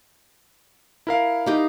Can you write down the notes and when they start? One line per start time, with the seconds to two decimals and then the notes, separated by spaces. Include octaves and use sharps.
1.07 E4 A#4 F5
1.46 D#4 G4 D#5